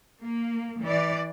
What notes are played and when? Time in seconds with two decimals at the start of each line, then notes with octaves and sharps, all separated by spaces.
0.23 A#3
0.83 E3 D5